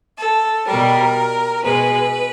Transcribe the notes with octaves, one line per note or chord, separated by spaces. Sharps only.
A4
B2 G3 A#4
B2 G#3 B4